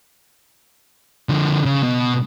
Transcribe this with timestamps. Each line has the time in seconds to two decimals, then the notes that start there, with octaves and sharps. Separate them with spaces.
1.29 D3 F3
1.65 C#3
1.83 B2